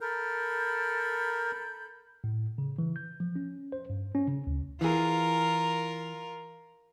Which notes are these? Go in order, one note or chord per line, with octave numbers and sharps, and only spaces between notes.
A4 A#4 B5 G6
A2
C#3
E3
G6
F3
C#4
C5
G2
C#4
C#3
D2
E3 F4 G#4 A#4